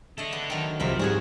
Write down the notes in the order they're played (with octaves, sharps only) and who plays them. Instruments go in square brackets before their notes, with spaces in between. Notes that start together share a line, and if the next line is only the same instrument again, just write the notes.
[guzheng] A3 D#5 [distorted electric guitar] D4 A4
[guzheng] B3
D#3 F#3
[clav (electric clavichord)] C2 C3 F3 [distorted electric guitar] F2 [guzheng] A#4 E5 B5
[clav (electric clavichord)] G#2 G3 [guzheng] F#4 G#4 C#5